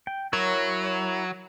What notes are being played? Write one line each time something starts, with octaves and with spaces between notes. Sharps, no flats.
G5
F#3 E4 A#4 C#5